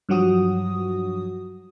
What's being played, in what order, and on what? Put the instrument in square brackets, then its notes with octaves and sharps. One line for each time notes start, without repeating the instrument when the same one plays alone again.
[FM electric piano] G2 F3 F#3 F#4 D#6